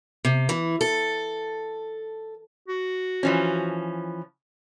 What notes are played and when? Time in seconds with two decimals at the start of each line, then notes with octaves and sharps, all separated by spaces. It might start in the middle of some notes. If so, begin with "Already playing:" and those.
0.25 C3
0.49 E3
0.81 A4
2.68 F#4
3.23 E3 F3 C#4